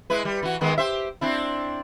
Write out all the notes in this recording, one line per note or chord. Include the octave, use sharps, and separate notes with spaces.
G#3 E4 B4
G3
E3 F#4
D#3 G#3 B3
G4 C5 E5
C4 D4 E4